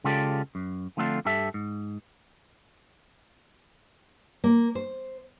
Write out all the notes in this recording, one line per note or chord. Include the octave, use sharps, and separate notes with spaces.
C#3 G#3 F4 G4 A4 D5
F#2
D3 F3 A3 C4 D4 F4
G2 G4 A4 E5
G#2
A#3
C5